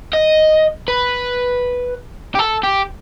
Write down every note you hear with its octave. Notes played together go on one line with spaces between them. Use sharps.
D#5
B4
G4
A4
G4